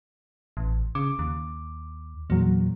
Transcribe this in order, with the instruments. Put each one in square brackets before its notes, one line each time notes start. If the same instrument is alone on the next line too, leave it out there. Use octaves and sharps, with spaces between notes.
[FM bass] A1
[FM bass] C#3 [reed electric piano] D6
[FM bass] D#2
[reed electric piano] E2 F#3 [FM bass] A#2